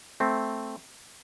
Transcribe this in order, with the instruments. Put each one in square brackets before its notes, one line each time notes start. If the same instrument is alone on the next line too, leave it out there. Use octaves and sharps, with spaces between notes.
[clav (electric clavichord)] A3 C4